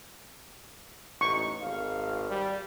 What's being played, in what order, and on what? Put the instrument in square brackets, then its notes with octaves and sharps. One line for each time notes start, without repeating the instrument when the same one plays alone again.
[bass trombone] A1 [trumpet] D#4 [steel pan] C#6
[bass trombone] G#1 [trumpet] F5
[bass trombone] G3